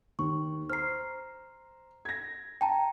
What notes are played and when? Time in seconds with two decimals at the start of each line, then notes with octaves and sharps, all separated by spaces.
0.19 D#2 C#6
0.70 C5 A#5 F6 C7
2.05 G#6 A#6
2.61 G5 A5 A#5